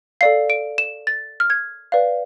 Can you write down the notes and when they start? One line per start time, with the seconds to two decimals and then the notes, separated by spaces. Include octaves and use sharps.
0.21 A4 D5 F5 C7
0.50 D7
0.78 E7
1.07 A6
1.40 F6
1.50 G#6
1.92 B4 D5 F5